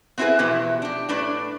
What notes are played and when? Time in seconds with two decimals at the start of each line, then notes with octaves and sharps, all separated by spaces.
0.18 B3 C4 E4 F#4 G#4 B4
0.39 E2 B2 F3 B3 E4 G4
0.82 D4 G4
1.09 A2 D4 B4 D5